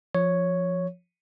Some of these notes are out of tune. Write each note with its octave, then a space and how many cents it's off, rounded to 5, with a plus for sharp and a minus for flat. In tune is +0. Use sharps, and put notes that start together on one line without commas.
F3 +0 C#5 +0